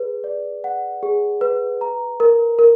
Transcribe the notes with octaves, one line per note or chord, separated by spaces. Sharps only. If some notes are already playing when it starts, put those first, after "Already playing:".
Already playing: G#4 B4
D5
F#5
G#4
B4
A#5
A#4
A#4